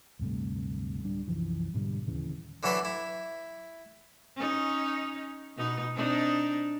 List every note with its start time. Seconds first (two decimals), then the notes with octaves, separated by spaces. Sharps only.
0.19 D1 G2 C3 A3
1.04 D1 G3 D4
1.27 C2 F#2 E3 F3
1.74 G#2 B2 D3 G3
2.06 D1 D#2 C#3 E3
2.63 D3 E3 F#3 D4 A4 B4
2.85 E4
4.36 C#4 D#4
5.56 B2 D#4
5.95 C4 D4 D#4